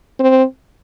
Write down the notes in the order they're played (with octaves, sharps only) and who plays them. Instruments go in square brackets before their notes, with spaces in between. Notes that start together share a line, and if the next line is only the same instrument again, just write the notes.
[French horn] C4